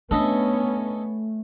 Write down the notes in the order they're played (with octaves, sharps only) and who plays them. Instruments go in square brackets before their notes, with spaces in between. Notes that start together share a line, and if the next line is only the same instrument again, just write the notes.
[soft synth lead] A3 [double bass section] B3 C#4 [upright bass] D4 [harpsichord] A4 D#5 E5